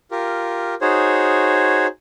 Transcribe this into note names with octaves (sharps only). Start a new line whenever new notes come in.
F4 G4 A#4
D#4 F#4 G#4 C5 C#5